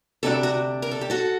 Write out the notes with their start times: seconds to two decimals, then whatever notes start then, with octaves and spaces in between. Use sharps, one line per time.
0.23 D2 C3 G3 D4 F#4 A4
0.43 F#4
0.82 A#4
0.91 A4
1.01 G4
1.10 F#4 A4